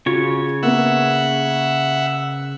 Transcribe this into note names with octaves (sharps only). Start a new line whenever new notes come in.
C#3 F4 F#4 C#5
A#3 B3 E5 F#5